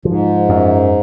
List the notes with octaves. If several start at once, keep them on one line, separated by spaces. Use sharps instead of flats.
G#2 F3
F#2